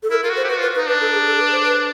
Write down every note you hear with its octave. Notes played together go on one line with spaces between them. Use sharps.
A4
E4 A#4
F4 A#4
F#4
C5
G4
F#4 B4
F4 B4
B4
D#4
D4 B4
A4
G#4
A4
B4
C5
B4